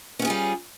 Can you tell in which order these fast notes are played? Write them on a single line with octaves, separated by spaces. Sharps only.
C#4 B3 G#4 F4 G3